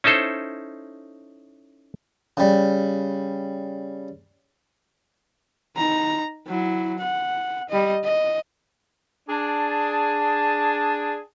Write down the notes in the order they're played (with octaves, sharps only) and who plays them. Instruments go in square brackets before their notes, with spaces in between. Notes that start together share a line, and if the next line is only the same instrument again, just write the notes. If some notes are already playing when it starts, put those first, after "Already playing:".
[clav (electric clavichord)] C#4 D#4 E4 A4 C5
[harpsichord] C#3 G3
[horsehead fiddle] D#4 A#5
F#3 E4
F#5
G3 D#5
D#5
[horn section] D4 G#4 A5